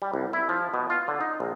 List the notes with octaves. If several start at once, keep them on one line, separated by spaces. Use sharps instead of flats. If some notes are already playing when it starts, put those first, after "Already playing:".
G3
C2
E4
F3
B2
F4
D3
D#4
A#1